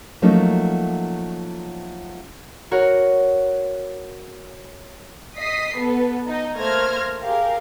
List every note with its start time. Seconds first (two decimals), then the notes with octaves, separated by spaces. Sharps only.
0.22 F3 F#3 A3 A#3 C#4 D#4
2.71 F#4 A#4 C#5 F#5
5.38 D#5 D#6 B6 C7
5.75 B3 A4 B4
6.27 D#4 D#5
6.58 A3 A#3 C5 F6 G#6 A#6
7.24 G4 G#4 A#4 F5